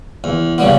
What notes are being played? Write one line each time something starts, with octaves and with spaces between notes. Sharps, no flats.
E2
C#3 G3 B3